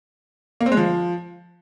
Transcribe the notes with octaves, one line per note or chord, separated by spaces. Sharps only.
A#3
C4
G#3
F3